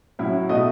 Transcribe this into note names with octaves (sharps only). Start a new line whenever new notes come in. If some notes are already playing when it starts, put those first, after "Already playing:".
A2 F#3 C#4 E4
B2 A3 D#5